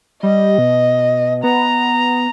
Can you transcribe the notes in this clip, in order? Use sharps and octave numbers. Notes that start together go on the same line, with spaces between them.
G3 D#5
B2
B3 A#5